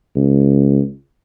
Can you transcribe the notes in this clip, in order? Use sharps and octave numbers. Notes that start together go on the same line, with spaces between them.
C#2